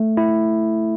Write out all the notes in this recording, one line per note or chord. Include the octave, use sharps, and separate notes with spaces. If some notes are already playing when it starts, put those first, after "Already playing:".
Already playing: A3
E4